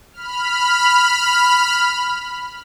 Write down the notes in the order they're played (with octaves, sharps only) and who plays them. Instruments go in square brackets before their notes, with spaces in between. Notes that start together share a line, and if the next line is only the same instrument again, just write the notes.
[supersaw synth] B5 F6